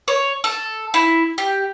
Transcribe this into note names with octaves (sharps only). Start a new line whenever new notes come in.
C#5
A4
E4
G4